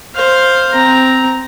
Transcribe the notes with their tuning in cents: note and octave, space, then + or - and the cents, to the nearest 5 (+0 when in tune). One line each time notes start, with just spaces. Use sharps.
C5 +5 F5 +0
C4 -10 A#5 +0